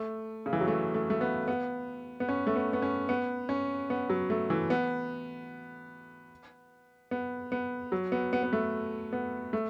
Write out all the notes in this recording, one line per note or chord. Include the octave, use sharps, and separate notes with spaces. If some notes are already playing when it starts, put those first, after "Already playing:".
Already playing: A3
C#3
E3
F#3
A3
A3
A3
B3
B3
B3
C#4
A3
B3
B3
C#4
B3
C#4
B3
F#3
A3
E3
B3
B3
B3
F#3
B3
B3
B3
A3
B3
A3